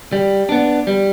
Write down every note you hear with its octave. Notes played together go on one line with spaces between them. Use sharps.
G3
B3 D4
G3